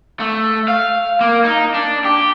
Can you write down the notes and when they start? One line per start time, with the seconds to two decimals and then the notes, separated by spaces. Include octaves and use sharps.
0.20 A3
0.68 F5
1.21 A#3
1.44 D#4
1.74 D4
2.05 G4